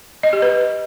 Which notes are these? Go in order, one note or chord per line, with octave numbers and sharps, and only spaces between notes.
D#5
G4
B4